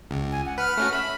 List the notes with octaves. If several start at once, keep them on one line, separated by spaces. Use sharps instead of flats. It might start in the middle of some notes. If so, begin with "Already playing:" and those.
C#2
G#5
F#5
B4 F6
A3 C#4 F#4
E5 B5